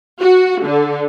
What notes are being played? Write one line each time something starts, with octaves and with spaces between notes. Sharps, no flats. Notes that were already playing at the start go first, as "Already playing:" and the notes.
F#4
D3